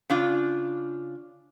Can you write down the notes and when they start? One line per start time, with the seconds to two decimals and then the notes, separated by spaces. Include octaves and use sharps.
0.10 C#3 D4 F4